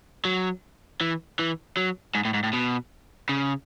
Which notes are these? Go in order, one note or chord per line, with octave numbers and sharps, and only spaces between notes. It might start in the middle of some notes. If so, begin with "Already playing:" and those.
F#3
E3
E3
F#3
G#2
A2
G#2
A2
B2
C#3